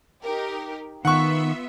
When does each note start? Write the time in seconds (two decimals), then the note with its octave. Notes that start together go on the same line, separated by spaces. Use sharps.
0.23 D#4 G4 A#4
1.05 D#3 B3 F4 E5 F#5 C#6